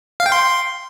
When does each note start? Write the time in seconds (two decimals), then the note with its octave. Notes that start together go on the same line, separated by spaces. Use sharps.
0.20 F5
0.26 G5
0.32 C6